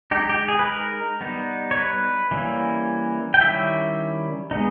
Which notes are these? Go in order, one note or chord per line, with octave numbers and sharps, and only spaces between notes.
G#3 D#4 G4
G4
G#4
B4
A#4
G3 B3 D#4
C#5
B4
E3 G3 A#3 C#4 E4
G5
D#3 G3 C#4 E4 E5
G#3 B3 D#4